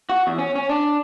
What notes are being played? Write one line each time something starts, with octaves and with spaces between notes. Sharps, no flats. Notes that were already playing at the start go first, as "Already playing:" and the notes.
F#4
E2
C#4
C#4
D4